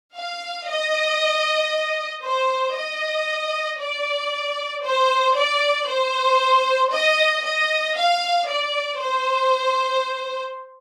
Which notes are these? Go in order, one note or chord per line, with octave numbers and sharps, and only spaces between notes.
F5
D#5
C5
D#5
D5
C5
D5
C5
D#5
D#5
F5
D5
C5